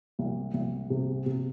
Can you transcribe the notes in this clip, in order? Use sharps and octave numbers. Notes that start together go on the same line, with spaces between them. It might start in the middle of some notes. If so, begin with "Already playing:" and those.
C2
C2
C3
C3